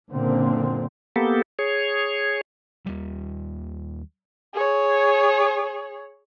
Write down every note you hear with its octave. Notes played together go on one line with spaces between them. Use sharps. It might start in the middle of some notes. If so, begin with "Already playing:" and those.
F#1 A#2 D3 C4
A#3 B3 G4 A4
G#4 C#5
D#2 G3
G#4 C#5